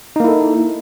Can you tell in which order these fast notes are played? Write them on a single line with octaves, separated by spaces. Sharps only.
D#4 A#3 E4 A4